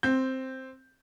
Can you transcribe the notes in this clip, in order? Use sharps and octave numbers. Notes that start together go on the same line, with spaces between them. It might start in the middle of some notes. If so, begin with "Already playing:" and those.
C4 G6